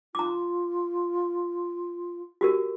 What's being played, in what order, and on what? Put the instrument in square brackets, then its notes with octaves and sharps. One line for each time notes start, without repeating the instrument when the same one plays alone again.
[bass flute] F4 [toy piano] A#5 D6
[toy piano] F#4 G4 A#4